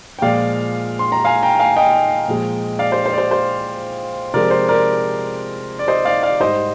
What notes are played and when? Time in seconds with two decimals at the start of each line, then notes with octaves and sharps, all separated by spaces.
0.19 G5
0.22 A#2 F3 G#3 D5 F5
0.99 C6
1.12 A#5
1.25 F5 G#5
1.42 G5 A#5
1.59 F5 G#5
1.77 D#5 G5
2.28 A#2 F3 G#3
2.79 D5 F5
2.92 C5
3.06 C5
3.14 D5
3.18 C5
3.31 C5
4.34 C3 F3 G#3 A#4 D5
4.51 C5
4.68 A#4 D5
5.79 D5
5.88 C5 D#5
6.05 D5 F5
6.23 D5 F5
6.40 G#2 G3 C5 D#5